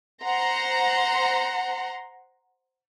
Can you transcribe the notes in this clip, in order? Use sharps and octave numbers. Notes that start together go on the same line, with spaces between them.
C5 F#5 A#5 C6